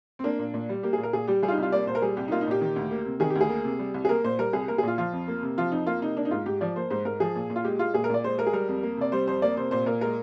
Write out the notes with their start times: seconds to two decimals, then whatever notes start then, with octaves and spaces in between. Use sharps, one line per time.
0.19 C4
0.24 A#3 D4
0.39 A#2
0.54 A#2
0.69 G3
0.83 A#3 G4
0.93 G#4
0.98 A#2
1.03 A#4
1.13 A#2 G#4
1.27 G3 G4
1.42 G3 G#4
1.48 F4
1.52 D#4
1.57 C2
1.63 F4
1.72 A#3 D5
1.87 A#2 C5
1.95 A#4
2.02 G3 G#4
2.17 C2 G4
2.28 D#4
2.31 A#3 F4
2.41 D#4
2.47 A#2 G4
2.61 D#3
2.76 D2
2.91 A#3
3.05 C3
3.20 D#3 G#4
3.30 G4
3.35 D2
3.41 G#4
3.49 A#3
3.64 C3
3.79 G3
3.94 C2
4.05 G#4
4.09 A#3 A#4
4.24 A#2 C5
4.39 G3 A#4
4.53 C2 G#4
4.68 A#3 A#4
4.78 G#4
4.83 A#2 F4
4.98 F3 F4
5.13 F2
5.28 A#3
5.43 C3
5.58 F3 F4
5.72 F2 D#4
5.86 A#3 F4
6.01 C3 D#4
6.16 A#3 D4
6.25 D#4
6.31 G#2 F4
6.46 G#2 G4
6.61 F3 D5
6.76 A#3 C5
6.90 G#2 C5
7.05 G#2 A#4
7.20 F3 G#4
7.35 A#2
7.50 A#2
7.56 F4
7.64 G#3 G4
7.79 G#3 F4
7.94 A#2 G#4
8.04 A#4
8.09 A#2 D5
8.24 G#3 C5
8.38 G#3 A#4
8.47 G#4
8.53 G3 A#4
8.68 F2
8.83 A#3
8.97 C3 D5
9.12 G3 C5
9.27 F2 C5
9.42 A#3 D5
9.57 C3 C5
9.71 A#2 C5
9.86 A#2 A#4
10.01 G#3 A#4